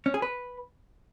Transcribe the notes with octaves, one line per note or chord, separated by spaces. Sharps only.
C#4
G#4
B4